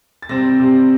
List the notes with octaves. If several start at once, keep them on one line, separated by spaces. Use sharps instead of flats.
A6
C3 G3 C4 A#6
C3 G3 C4